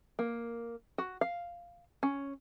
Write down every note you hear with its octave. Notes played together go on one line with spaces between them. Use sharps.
A#3
F#4
F5
C#4